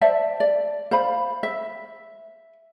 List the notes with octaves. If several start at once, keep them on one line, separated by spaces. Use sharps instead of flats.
C5 D5 E5 A5
D5
C5 F5 B5
E5